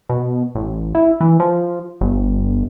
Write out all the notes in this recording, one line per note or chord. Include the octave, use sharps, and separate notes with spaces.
B2
A1
E4
E3
F3
G1